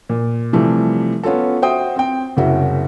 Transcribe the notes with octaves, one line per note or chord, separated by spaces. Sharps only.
A#2
C3 E3 F3 G3 A3
B3 C#4 F4 A4
F#4 C5 E5 G5 D#6
C4 G5
F#1 C2 C#3 F#4 E5